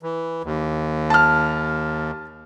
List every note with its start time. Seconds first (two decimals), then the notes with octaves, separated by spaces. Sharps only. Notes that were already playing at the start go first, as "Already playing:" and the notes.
0.03 E3
0.44 D#2
1.10 A5 F6